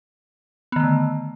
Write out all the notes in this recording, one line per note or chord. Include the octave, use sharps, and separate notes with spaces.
D3 D#3 A3 B3